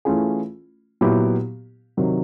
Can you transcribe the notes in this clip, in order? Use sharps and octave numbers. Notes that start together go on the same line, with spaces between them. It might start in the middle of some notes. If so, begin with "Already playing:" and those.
E3 A3 C#4 F4 G#4
A#2 F#3 B3 E4 G4
C3 D#3 F#3